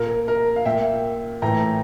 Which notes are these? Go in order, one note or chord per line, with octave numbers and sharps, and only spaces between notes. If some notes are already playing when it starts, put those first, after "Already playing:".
Already playing: A#2 A#4
A#4
F5
A#2 E5 G5
A2 E3 G5 A#5